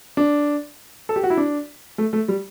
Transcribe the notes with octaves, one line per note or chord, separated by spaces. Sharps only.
D4
A4
G4
F#4
E4
D4
A3
A3
G3